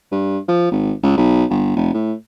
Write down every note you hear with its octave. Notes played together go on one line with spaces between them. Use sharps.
G2
F3
G#1
C#2
B1
G1
F1
A2